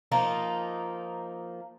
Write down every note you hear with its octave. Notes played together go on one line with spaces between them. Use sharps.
F3 A#3 D#4 F4